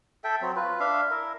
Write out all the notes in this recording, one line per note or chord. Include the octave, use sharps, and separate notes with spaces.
A4 E5 G5
F#3 C4
F4 B4
D4 E5 F5
E4 A#4